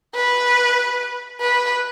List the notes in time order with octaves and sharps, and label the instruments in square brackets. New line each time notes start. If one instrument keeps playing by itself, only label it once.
[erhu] B4
B4